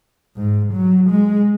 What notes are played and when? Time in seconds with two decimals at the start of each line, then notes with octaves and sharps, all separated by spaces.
0.36 G#2
0.73 F#3
1.10 G#3